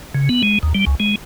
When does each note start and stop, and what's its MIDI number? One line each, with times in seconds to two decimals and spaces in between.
0.14 0.29 49
0.29 0.42 59
0.43 0.58 56
0.63 0.73 39
0.75 0.85 55
0.86 0.95 37
1.00 1.15 56